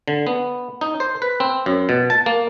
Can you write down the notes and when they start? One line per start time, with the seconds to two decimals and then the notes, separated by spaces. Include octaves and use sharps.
0.08 D3
0.27 B3
0.81 D#4
1.00 C5
1.22 B4
1.40 C4
1.66 F#2
1.89 B2
2.10 A5
2.26 A#3